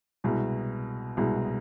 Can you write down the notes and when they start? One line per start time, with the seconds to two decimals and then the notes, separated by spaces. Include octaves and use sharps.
0.24 C2 B2 G#3
1.17 C2 B2 G#3